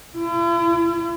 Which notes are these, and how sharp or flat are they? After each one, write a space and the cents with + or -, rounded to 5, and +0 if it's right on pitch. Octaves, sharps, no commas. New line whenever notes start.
E4 +45